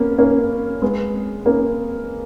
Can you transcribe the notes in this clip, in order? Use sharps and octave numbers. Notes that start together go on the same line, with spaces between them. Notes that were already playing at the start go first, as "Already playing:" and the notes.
Already playing: A#3 B3 C#4
A#3 C#4
G#3 B3
A#3 C#4